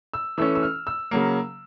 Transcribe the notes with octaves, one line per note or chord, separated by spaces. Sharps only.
E6
E3 A3 C#4 E6
E6
F6
E6
C#3 F#3 A#3